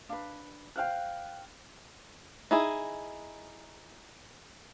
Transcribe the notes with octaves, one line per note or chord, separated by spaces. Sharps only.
D4 B4 F5
C5 F5 G5 F6 F#6
D#4 E4 G#4